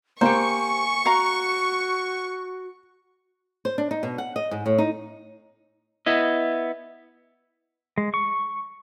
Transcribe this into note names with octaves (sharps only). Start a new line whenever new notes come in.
A#3 G4 C5 G#5 C#6
F#4 F5 A#5
C5
D4
D#4
B2
F#5
D#5
G#2
A2
D#4
B3 E4 D#5
G#3
C#6